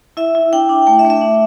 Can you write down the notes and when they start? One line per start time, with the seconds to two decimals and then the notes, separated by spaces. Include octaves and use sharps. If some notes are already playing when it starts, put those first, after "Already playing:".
0.17 E4 E5
0.35 E4
0.53 D4 G5
0.69 D4
0.87 A3 G5
0.99 E5
1.05 A3
1.10 E5
1.21 D4